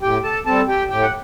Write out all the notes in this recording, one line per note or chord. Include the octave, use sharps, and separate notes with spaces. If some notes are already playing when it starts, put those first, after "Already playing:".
A2 G4 G5
A4 A5
G3 C4 A4 A5
G4 G5
A2 G4 G5
F#5